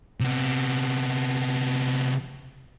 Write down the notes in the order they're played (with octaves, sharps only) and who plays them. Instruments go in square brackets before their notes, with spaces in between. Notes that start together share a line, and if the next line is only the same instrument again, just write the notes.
[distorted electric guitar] C3 B3